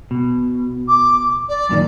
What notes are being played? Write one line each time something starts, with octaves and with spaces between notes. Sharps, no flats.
B2
D6
D5
F#2 A#2 D#3